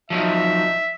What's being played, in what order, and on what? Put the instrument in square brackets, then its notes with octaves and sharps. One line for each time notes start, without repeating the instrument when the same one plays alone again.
[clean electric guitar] F3 F#3 D#4 [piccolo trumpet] E5